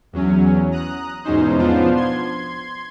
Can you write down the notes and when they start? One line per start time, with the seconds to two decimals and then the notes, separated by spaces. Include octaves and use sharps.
0.13 E2 F#3 C#4
0.71 A#5 D#6 F#6
1.24 E2 G#2 B2 C#4 D#4 C5
1.58 F3 B3 D4 F4 C5
1.96 C6 G#6